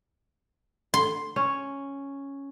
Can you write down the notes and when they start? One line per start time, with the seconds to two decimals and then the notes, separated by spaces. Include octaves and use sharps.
0.94 C6
1.36 C#4